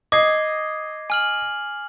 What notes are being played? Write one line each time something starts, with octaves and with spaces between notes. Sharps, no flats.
D#5 D6 G#6 C7
G#5 F6 F#7